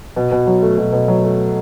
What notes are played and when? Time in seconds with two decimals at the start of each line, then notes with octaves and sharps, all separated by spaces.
0.16 B2
0.32 B2
0.47 F#3
0.63 A3
0.78 B2
0.92 B2
1.08 F#3
1.23 A3